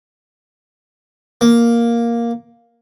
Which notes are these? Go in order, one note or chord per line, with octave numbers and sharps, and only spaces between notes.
A#3